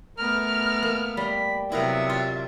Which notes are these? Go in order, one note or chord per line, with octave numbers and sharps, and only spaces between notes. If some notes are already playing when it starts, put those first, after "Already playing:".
A3 B3 A#4 F6
A#3
G3 B5
C3 F#3 B3 E4 A#4 E5 F5
F4